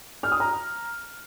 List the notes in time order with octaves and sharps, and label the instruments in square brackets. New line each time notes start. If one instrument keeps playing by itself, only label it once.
[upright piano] F6
D#6
A#5